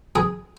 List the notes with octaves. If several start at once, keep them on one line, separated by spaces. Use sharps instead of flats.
G#4